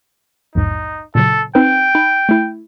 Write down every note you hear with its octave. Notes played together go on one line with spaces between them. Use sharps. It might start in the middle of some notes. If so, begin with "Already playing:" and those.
A#1 E2 G#2 D#4
A#2 C#3 F#3 A4
C4 D#4 B4 G5
D#4 B5
A3 E4